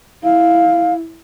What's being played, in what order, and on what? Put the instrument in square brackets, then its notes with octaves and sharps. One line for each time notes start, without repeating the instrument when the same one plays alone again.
[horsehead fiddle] E4 [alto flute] F5